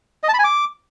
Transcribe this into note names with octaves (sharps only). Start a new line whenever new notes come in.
D#5
A5
B5
G#5
D6